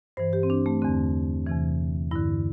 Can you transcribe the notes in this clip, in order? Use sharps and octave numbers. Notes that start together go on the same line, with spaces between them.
G2 E3 C5
G4
C4
D4
A3
E2 D3 C4
E2 C3 E3
G2 D3 E4